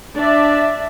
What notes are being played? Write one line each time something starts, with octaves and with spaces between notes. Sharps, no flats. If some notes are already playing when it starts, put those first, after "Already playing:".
D4 D5 E5